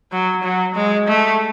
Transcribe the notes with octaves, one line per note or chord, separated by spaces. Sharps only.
F#3
F#3
G#3
A3